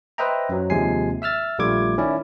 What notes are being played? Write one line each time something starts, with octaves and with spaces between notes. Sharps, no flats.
B4 C5 D#5 E5 G5 A#5
F#2 F#3
D#2 C3 F3 G#3 G#5 C7
E5 E6 F6 A6
A#1 G3 A3 F4 D6 G#6
D#3 C#4 E4 D5